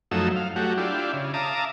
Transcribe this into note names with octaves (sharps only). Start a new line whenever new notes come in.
F#2 F3 F#3 A3 D#4 E6
F5
F#3 A3 F#4 G4
D4 E4 F4 G4
C#3
E5 F5 A5 A#5 D6 D#6